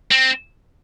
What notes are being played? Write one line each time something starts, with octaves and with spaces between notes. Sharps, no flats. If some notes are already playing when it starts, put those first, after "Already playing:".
C4